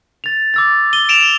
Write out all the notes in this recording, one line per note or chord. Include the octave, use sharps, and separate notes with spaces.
A6 F7
D6 E6 A6
D#7 G7
D7 E7 F7